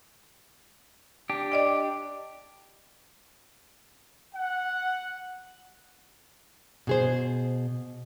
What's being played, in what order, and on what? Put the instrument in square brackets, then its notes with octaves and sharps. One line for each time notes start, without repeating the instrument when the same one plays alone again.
[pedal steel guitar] D4 G4
[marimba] D5 D#5 G5
[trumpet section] F#5
[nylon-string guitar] B2 G#4 C5